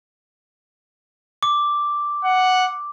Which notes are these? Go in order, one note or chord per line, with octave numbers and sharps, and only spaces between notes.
D6
F#5